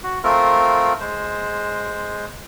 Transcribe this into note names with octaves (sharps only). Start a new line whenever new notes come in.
F#4
A3 C4 F4 A#4
G#3 C5